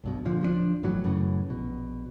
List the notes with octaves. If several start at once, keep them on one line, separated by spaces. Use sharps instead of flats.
B1 G2 B2
A#2 D3 F3
D1 F3 C4 D4
G1 A2 E3 F#3
F#2 A2 C#3 E3
A#1 B2